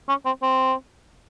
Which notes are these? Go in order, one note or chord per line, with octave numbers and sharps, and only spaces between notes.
C#4
C4
C4